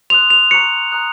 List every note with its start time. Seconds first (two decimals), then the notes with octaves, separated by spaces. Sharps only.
0.10 C6 D#6 F#6 F7
0.30 F7
0.51 A#5 C#6 F#6 C#7
0.92 A#5 D#6 F#6